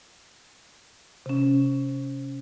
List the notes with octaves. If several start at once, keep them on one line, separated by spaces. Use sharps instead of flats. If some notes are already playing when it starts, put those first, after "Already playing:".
C3 C#4